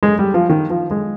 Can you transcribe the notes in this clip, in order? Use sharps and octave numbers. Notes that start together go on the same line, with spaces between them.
G#3
G3
F3
D#3
F3
G#3